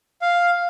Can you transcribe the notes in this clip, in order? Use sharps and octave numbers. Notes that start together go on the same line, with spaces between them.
F5